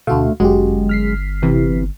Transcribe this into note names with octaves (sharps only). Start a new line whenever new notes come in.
D2 B2 D3 A3 F#4 F5
G1 F#2 G#3 F#4 G4
F6 B6 C7
C3 E3